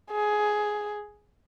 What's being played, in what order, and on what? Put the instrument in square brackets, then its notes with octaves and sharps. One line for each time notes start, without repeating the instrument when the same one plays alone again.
[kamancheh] G#4